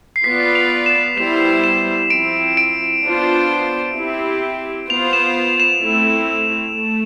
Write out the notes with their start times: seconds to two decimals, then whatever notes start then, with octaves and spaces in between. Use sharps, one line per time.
0.16 C7
0.24 B3 F4 B4 D5 B6
0.55 F7
0.86 E7
1.17 G3 B3 E4 G4 C5 E7
1.64 E7
2.10 F3 C4 E4 D7
2.57 D7
3.03 B3 D4 F4 C5
3.96 C4 E4 G4
4.89 B3 F4 C5 F7
5.13 E7
5.60 E7
5.82 A3 C4 E4
6.75 A3